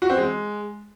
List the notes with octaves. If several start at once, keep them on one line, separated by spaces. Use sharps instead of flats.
F#4
C4
G#3